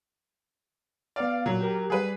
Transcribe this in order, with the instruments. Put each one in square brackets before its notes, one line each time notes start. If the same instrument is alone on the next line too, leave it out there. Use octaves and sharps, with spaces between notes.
[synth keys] B3 F5 [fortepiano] D5
[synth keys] A#2 [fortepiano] F#3
[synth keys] G4 A#4
[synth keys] G3 [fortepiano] G#4 B4